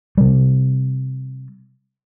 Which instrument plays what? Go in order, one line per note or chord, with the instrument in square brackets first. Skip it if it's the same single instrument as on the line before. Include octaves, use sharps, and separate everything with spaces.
[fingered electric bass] C3 G3